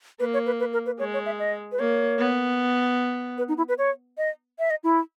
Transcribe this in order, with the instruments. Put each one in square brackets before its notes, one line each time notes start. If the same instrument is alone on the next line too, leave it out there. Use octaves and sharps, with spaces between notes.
[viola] A#3 [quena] B4
[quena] C#5
B4
B4
A#4
B4
[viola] G#3 [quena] C#5
[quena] C#5
E5
D#5
B4
[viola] A#3 [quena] C#5
[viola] B3
[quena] B4
D#4
E4
B4
C#5
D#5
E5
D#5
E4